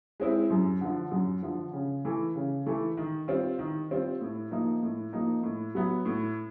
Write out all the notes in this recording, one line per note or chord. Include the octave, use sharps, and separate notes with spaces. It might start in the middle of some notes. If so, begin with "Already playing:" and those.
G#3 C4 E4
F#2
D3 F3
F#2
D3 F3
C#3
E3 A3
C#3
E3 A3
D#3
G3 C4 F4
D#3
G3 C4 F4
A2
F3 A#3 D#4
A2
F3 A#3 D#4
A2
F#3 B3
A2